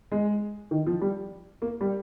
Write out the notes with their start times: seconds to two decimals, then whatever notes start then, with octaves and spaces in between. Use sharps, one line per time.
0.12 G#3
0.71 D#3
0.86 F3
1.01 G3
1.62 A#3
1.81 G3